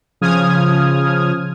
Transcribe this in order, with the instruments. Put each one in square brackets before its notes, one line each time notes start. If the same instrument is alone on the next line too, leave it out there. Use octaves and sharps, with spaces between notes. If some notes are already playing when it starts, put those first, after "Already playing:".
[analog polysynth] C#3 F3 D#6 F6 G#6